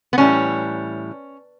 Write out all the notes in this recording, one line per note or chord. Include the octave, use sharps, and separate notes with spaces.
B3
A2 E3 G3 C#4